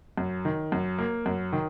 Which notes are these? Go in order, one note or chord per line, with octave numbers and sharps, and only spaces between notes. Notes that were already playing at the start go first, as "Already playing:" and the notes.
F#2
D#3
F#2
A#3
F#2
D#3